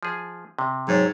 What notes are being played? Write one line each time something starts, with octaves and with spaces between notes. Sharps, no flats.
F3 G#4
C3
G#2 F#3 C#5